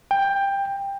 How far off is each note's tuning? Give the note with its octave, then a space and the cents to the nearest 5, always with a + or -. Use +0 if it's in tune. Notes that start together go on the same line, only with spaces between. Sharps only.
G5 +15